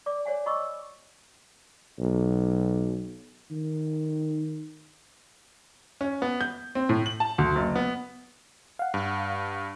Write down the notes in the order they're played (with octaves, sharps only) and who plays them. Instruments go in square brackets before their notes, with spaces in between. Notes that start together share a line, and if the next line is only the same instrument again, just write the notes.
[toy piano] D5 D6
C#5 D5 F#5 G#5
D#5 B5 C#6 D6 E6
[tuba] B1
D#3
[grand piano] C#4
B3
G6
C4
A2
F#7
A5
D2
F#1
B3
[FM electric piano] F5 F#5
[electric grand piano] G2